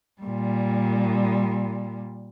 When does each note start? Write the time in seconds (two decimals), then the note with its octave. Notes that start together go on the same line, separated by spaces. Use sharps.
0.22 A#2 G3